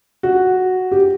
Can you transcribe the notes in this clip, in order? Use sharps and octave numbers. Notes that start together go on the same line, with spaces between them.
F#4
G4